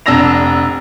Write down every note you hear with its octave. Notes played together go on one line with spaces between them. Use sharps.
F1 D4 E6 A#6 F7